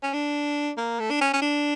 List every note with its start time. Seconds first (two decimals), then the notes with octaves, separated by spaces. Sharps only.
0.03 C#4
0.13 D4
0.77 A#3
1.00 A3
1.10 D4
1.21 C#4
1.34 C#4
1.42 D4